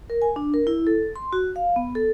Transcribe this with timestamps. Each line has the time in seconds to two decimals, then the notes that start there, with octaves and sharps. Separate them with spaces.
0.10 A#4
0.22 G#5
0.36 D4
0.54 A#4
0.67 E4
0.87 A4
1.16 C6
1.33 F#4
1.56 F5
1.76 B3
1.95 A4